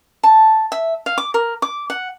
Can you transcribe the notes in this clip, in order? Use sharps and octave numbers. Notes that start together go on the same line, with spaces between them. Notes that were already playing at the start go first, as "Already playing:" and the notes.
A5
E5
F5
D6
A#4
D6
F#5